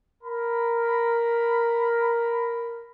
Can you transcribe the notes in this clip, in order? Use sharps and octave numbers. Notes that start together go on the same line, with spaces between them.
A#4 B5